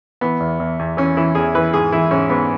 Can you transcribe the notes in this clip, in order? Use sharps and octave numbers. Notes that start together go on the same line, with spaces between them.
E3 B3
E2
E2
E2
E3 C#4
E3 E4
E2 G#4
E3 B4
G#2 G#4
E3 E4
G#2 C#4
G#2 B3